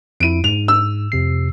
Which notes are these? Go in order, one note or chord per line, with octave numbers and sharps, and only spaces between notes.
F2 E4 D7 D#7
G#2 F7
E6
F2 C3 C7